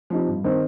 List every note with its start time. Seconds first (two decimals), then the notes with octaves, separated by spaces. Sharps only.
0.10 F3 C4 D#4 G4
0.27 G2
0.44 D#3 C4 D#4 C5